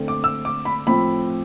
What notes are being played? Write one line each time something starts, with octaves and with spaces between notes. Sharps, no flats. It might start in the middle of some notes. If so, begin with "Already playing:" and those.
Already playing: D3 A3 C4
D6
E6
D6
B5
A2 F3 C4 B5